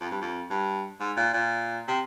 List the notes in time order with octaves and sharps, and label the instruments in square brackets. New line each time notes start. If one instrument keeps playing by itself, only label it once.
[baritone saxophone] F2
G2
F2
G2
G#2
A#2
A#2
C3